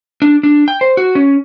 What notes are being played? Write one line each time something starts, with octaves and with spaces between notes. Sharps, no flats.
D4
D4
G5
C5
F#4
C#4